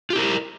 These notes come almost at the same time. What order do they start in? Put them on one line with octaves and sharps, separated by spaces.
F4 G4 E4 A#4